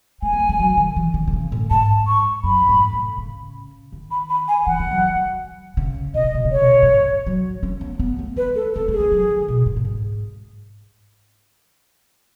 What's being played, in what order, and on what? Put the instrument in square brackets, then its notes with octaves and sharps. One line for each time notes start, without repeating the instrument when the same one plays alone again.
[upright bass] A3 [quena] G#5
[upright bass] B3
A3
G#3
F#3
D#3
E3
D#3
D#3
C#3
A2
[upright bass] G#2 [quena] A5
[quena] C#6
[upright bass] F#2 [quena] B5
[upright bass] G#2
A2
C#3
D#3
[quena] B5
B5
G#5
[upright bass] E3 [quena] F#5
[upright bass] E3
F#3
F#3
C#3
[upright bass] B2 [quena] D#5
[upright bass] C#3
B2
C#3
[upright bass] B2 [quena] C#5
[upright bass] G#2
A2
F#3
C#4
B3
B3
A3
[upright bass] G#3 [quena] B4
[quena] A4
[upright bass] B3 [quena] A4
[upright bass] A3 [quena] G#4
[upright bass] G#3
F#3
D#3
B2
G#2
A2
G#2